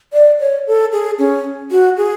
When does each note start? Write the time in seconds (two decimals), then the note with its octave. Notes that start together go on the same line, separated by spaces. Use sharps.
0.13 D5
0.40 C#5
0.67 A4
0.93 G#4
1.19 C#4
1.71 F#4
1.97 G#4